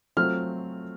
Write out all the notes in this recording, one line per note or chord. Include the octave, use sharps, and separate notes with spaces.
F#3 A3 C4 F4 F6